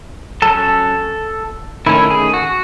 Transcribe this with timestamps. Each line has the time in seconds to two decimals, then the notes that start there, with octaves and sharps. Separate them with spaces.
0.42 F#3 C#4 A4
1.86 D#3 A3 C#4 E4
2.10 G#4
2.34 F#4